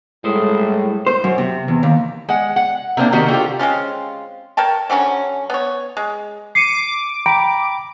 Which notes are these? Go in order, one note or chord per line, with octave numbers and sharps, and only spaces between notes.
A2 G3 G#3 C5
C5
F#2
C3
E2
D#2
G#3 F#5
F#5
C3 A#3 C4 D4
D#3 A#3 C4 F#4 G4
D3 F4 G4
G#3 C4 C#4 F4
A#4 C#5 G5 A5
D3 F#3 C#4 C#5
B3 C#5
G#3
D6 C7 C#7 D#7
G5 A#5 B5 D7